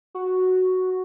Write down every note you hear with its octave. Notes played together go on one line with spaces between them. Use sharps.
F#4